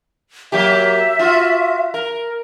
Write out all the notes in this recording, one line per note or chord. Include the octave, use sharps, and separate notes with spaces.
F#3 A#3 G4 E5
F4 F#4
A#4